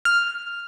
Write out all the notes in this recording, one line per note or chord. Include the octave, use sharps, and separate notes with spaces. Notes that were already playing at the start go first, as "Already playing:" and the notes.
F6